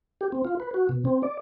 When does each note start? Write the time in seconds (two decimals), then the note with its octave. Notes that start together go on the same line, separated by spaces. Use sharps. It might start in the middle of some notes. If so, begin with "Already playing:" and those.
0.21 G4
0.32 C4
0.45 F4
0.60 B4
0.74 F#4
0.89 B2
1.05 C4
1.23 D5